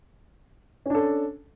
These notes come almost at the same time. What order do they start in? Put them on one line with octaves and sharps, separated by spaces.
C#4 D4 A4